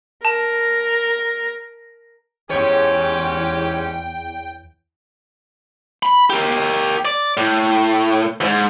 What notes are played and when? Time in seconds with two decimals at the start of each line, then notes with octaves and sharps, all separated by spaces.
0.25 A#4 A5
2.50 E2 G#2 C#4 G4 C#5 G5
6.03 B5
6.30 G4 A#4
7.05 D5
7.37 A2
8.41 E2 G#2